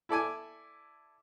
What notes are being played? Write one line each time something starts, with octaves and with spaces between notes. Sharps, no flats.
E4 A4 D5 G#5